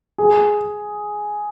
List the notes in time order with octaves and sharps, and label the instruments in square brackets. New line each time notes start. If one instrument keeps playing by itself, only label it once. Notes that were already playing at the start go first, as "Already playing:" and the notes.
[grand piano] G#4